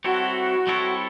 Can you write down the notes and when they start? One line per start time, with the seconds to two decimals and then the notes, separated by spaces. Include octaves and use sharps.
0.04 G3 C4 E4 F#4 A4 C#5
0.67 G3 C4 E4 A4 C#5